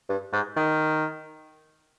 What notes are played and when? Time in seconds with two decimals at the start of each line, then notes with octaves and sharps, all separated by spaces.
0.09 G2
0.33 G#2
0.56 D#3